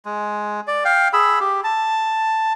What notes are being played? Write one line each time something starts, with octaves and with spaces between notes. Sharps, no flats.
G#3
D5
F5 G5
G#4 B5 E6
G4
A5